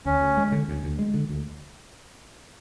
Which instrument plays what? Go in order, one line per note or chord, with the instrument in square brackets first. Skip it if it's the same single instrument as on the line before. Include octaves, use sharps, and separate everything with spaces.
[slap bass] D2 [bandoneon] C#4
[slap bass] D2
G#3
D3
D2
D2
G#3
D3
D2